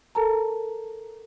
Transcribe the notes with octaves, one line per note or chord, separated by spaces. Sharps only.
A4 A#4 A5 A#5